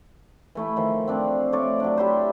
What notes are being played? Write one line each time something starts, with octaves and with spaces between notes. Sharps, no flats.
E3 A3 E4
D#3 F3
C4 D4 D5
A3 C#5 D5 D6
F#3 D4
E4 G4 B4 C5